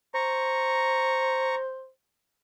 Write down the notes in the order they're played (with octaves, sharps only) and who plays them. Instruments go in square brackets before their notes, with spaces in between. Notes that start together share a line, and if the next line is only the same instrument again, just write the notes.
[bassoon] C5 [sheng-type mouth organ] A#5 C#6